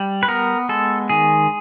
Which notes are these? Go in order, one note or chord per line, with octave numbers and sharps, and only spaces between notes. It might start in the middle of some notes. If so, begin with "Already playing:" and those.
Already playing: G3
B4
B3 A#4
G#3 A4
D#3 G#4